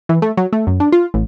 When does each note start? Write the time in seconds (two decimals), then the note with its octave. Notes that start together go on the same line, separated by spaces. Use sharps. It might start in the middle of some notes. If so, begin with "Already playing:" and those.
0.09 E3
0.22 A3
0.37 F#3
0.53 A3
0.67 F#2
0.80 D4
0.92 F4
1.14 A1